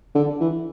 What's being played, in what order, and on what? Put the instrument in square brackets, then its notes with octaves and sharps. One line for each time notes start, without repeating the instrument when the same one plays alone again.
[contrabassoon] D3
E3